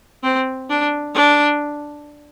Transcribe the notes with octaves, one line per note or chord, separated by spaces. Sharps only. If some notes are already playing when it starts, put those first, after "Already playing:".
C4
D4
D4